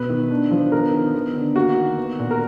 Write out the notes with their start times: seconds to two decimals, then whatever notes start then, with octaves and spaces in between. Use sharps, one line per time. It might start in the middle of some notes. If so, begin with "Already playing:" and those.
Already playing: B2 B3 B4
0.09 D#3
0.31 D4
0.51 F3
0.72 B3 A#4
0.93 D#3
1.14 B3
1.35 D3
1.56 A#3 F#4
1.76 D#3
1.97 B3
2.19 A#2
2.31 A#4